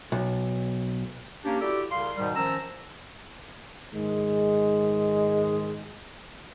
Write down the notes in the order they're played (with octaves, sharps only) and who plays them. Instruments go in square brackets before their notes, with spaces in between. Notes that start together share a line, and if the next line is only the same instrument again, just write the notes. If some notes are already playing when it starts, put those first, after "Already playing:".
[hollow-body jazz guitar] B1
[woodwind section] A#3 C#4 D4 G4
E4 F#4 G4 A4 D5
C2 C#3 F5 C6
G#2 B2 D#3 G3
D#3 F3 C#4 A#5 E6
[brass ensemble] G#2 D#3 G#3